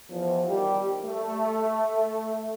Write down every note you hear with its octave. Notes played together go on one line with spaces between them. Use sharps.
E2 F3
D#3 G3 G4
A3